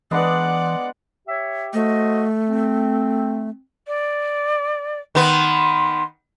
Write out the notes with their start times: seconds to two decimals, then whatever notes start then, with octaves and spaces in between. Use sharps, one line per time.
0.11 E3 G#3 B3 D4 D5 F#5
1.27 G4 C#5 E5
1.73 A3 F#4 C5 D#5
2.48 C4
3.87 D5
5.15 D#3 B3 C6